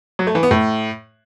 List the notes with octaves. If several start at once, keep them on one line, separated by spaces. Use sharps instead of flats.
F#3
A3
E3
B3
A2